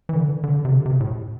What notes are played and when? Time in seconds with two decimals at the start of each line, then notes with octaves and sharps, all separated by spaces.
0.09 E3
0.16 D3
0.44 D3
0.65 C3
0.72 D3
0.86 C3
1.00 A2